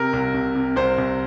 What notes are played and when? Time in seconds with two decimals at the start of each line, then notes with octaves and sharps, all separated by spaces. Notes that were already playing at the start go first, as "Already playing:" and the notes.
Already playing: C3 A#4
0.13 C2
0.34 C2
0.55 C3
0.76 C2 C5
0.98 C2